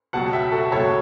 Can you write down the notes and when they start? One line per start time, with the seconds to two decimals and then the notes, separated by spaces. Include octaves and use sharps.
0.13 C#2 B2 F#3 F#5 A5
0.33 E5 G5
0.52 F#4 A4
0.72 C#2 B2 F#3 A4 C#5